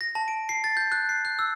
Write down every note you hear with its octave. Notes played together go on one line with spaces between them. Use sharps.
A#6
A5
D7
C7
A6
G6
F#6
C7
F#6
E6